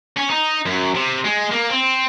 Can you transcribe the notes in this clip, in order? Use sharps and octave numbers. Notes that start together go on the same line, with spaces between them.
C#4
D#4
F#2
C3
G#3
A#3
C4